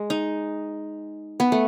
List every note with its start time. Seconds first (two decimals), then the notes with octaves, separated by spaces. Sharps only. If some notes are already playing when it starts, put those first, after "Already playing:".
Already playing: G#3
0.10 D#4
1.40 B3
1.52 A3